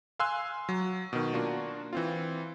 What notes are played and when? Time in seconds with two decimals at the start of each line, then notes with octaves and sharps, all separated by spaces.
0.19 F5 G#5 C6 E6 F#6
0.69 F#3
1.13 B2 D#3
1.33 A#3 D4 F4 F#4
1.93 E3 C4 F4